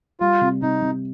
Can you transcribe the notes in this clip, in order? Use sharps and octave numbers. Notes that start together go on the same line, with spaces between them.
G3 F4
C3
C3 D#4
C3